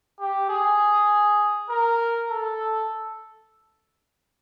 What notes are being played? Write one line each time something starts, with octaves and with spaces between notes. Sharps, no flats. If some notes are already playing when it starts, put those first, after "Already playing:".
G4
G#4
A#4
A4